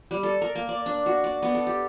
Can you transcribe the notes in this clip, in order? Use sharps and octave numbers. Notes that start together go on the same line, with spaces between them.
G3
A4
A#4
A#3
D5
D4
F#4
D5
B3
A4
G4